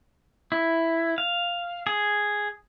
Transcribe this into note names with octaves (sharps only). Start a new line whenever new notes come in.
E4
F5
G#4